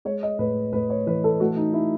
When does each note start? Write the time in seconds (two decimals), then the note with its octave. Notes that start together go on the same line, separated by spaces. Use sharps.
0.05 G#3 C#5
0.23 D#5
0.39 A2 B4
0.73 A2 B4
0.90 C#5
1.06 E3 B4
1.24 A4
1.40 A3 F#4
1.56 D#4
1.73 E4